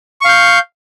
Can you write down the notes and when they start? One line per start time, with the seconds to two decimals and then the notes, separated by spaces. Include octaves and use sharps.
0.21 C#6
0.25 F5
0.29 G6